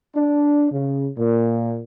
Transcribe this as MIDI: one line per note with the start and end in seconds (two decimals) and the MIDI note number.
0.15 0.67 62
0.71 1.08 49
1.17 1.80 46